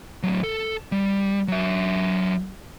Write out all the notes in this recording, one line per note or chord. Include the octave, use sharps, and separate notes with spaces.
A2 F#3
A4
G3
F#3 E5